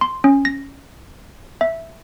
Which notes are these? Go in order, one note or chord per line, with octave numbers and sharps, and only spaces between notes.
C6
C#4
A#6
E5